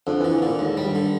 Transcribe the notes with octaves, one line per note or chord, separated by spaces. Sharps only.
F2 D3
E3
D3
E3
A#2 D3
D#2 G#2
G3
G2
D3